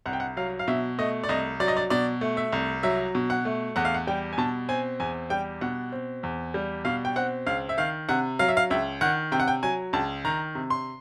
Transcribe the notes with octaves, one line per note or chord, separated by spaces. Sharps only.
C2 F#5
G5
F#5
F#3 F5
F5
B2 E5
A3 D#5
D5
C2 D#5
F#3 D5
D#5
D5
B2 D5
A3
E5
C2
F#3 E5
B2
F#5
A3
E2 F#5
F5
F#5
G3 G5
G#5
B2 A5
C4 G#5
E2 G#5
G3 G5
B2 F#5
C4
E2
G3
B2 F5
G5
C4 F#5
C#2 F5
E5
D#3 F5
C3 F#5
F#3 F5
E5
F5
C#2 E5
D#3 F#5
C3 G5
F#5
G5
F#3 G#5
C#2 A5
D#3 A#5
C3
C6